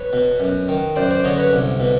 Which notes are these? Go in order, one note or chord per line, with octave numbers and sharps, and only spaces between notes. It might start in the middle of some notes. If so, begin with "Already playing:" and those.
Already playing: B4 C#5
B2
F#2
D#3
F#2 C5 D5
C5 D5
D3 C#5 D#5
B4 C#5
C2
B2